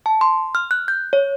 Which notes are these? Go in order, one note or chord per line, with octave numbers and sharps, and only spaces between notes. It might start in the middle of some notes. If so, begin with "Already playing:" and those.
A5
C6
F6
F#6
G6
C#5